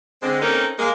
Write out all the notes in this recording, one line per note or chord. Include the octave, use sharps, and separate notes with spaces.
D3 G#3 C4
A#3 C4 C#4 D#4 A4 A#4
G#3 A#3